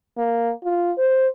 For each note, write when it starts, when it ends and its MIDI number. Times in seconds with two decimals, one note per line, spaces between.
0.17 0.52 58
0.64 0.91 65
0.97 1.27 72